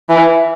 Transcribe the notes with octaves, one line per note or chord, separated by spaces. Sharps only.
E3